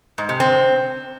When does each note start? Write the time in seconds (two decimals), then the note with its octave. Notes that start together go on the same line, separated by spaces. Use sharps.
0.18 G#2
0.29 C3
0.40 C4